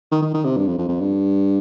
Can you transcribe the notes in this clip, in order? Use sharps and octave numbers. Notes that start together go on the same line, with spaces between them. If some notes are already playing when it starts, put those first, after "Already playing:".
D#3
D#3
D#3
C3
G2
F2
F2
F2
G2